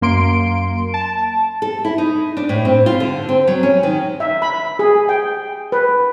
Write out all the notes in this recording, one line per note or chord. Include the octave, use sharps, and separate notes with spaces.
F#2 A#3 C6 D7
A5
A4
E4
D#4
D4
A2
C4
F4
D3
C4
F#3
C#4
D#3
E5
B5
G#4
G5
B4